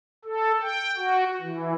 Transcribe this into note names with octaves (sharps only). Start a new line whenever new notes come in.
A4
G5
F#4
E3